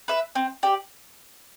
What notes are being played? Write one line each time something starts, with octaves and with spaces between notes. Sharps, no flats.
B4 E5
C4
G4 D5